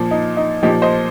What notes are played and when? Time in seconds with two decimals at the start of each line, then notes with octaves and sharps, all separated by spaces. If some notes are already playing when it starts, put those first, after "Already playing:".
Already playing: A#2 F3
0.11 D#4
0.37 D#4
0.63 A#2 F3 D#4 G4
0.82 C5 D#5